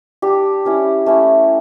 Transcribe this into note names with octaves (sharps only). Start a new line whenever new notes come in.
G3 D4 G4
G3 C#4 E4
A3 C#4 E4